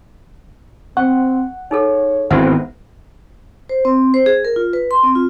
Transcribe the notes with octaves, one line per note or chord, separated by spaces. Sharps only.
C4 F#5 C#6
D#4 G#4 A4 C#5
G#1 E3 B3 C4 C5 E5 F#5
C5
C4
C5
G#4
A#4
F4
B4
C6
C4
F4